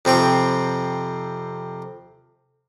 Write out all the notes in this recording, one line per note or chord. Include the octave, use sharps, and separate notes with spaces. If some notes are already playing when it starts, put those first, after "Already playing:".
F2 C3 C4 G5